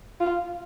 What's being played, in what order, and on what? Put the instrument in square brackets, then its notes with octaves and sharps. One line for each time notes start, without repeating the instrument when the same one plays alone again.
[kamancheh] F4